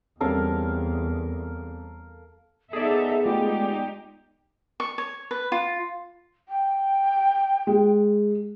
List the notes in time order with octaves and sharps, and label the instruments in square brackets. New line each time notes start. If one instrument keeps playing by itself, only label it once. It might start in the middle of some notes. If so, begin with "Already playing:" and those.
[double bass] E2 [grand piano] G3 C4 C#4 [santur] A4 A#4 F5
[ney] B3 [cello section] D#4 A4 E5 [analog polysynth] G#4 D5
[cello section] G#3 D#4 G4 [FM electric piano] A3 F4
[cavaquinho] C#6
C#5
B4
F4
[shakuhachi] G5
[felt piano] G#3